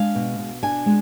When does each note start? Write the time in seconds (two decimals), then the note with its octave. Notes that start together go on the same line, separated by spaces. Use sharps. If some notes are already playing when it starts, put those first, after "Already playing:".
Already playing: G#3 D4 F5
0.15 B2
0.39 B2
0.63 D4 G#5
0.86 G#3